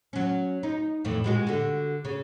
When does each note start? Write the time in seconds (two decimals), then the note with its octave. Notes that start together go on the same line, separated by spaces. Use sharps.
0.13 F#3 C#4
0.63 D#4
1.05 F2 A2 E3
1.24 A#2 G#3 F#4
1.47 D3 F#4
2.05 C#3